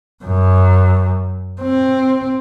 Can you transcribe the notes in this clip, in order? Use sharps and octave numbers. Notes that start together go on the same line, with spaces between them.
F#2
C4